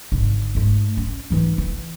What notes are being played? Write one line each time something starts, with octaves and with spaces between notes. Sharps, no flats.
G#1 D3
G#2 A3
C#4
G#2 E3
E3